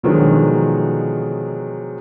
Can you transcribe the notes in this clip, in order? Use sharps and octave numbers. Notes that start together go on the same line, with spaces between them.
B2 D3 D#3 F3 F#3 G#3